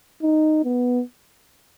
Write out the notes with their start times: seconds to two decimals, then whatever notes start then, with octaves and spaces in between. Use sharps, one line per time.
0.22 D#4
0.64 B3